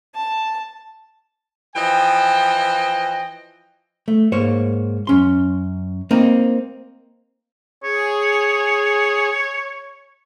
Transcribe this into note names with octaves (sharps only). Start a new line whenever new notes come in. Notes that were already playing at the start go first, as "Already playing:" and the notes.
A5
E3 F3 D#5 G5
A3
G#2 A#3 C5 C#5
F#2 C#4 C6
A#3 C4 D#4
G#4 C#5